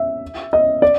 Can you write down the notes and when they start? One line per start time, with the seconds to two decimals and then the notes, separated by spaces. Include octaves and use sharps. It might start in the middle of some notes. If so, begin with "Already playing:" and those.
Already playing: E5
0.53 D#5
0.82 D5